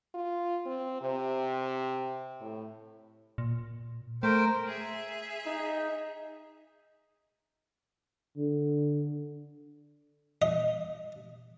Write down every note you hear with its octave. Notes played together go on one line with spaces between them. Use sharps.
F4
C4
C3
A2
A#2
A3 A#4 C5 G5
G#4 E5
D#4
D3
D#5